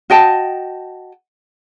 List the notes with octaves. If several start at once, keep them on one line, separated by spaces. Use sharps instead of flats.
F#4 D#5 G5 A5